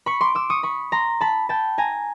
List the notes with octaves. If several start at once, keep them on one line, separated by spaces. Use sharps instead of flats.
B5 C#6
C6 D6
D6 E6
C#6 D#6
B5 C#6
A#5 C6
A5 B5
G5 A5
G#5 A#5